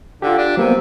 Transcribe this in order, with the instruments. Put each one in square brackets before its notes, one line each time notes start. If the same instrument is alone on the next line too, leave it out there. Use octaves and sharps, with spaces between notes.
[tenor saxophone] D3 [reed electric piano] F4 G4
[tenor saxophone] D4
[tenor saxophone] C3 [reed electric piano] F#3 A#3 B3